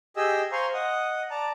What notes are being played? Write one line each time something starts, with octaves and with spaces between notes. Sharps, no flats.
G4 G#4 D#5 E6
C5 F5 G#5 A#5 C6 C#6
D#5 F#5 D#6
D5 A5 A#5